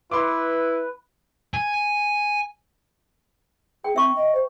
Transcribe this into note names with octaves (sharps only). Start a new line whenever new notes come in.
E4 B4 C6 D6
G#5
G#4 G5
C4 E5 C#6
D#5
C5